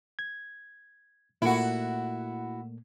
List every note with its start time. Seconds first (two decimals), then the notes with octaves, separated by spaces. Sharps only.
0.19 G#6
1.42 A#2 A3 A#3 E4 F#4